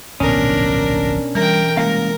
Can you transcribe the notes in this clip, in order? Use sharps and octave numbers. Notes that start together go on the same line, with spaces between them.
D1 A#1 B2 B3 C#4 D4 A#4
E3 G3 A#4 G5
C2 G#3 A#3 C#4 A#4 F5